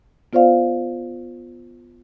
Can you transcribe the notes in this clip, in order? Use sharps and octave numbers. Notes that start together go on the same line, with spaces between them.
B3 F4 C5 D5 F5